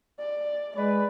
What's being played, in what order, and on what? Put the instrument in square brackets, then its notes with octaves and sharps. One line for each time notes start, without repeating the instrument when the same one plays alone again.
[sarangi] D5
[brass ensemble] G#3 B4 [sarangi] D5